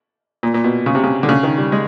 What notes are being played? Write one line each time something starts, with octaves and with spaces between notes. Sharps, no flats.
A#2
A#2
B2
C#3
C3
C#3
D3
C#3
D#3
G3
G#3